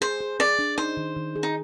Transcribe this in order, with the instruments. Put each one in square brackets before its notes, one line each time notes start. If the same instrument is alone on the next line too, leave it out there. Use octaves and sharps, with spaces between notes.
[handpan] G#4 [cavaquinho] C5
[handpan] G#4
[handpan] G#4 [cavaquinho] D5
[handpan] D4
[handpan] D#4 [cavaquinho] C5
[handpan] D#3
D#3
G#4
[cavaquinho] D#4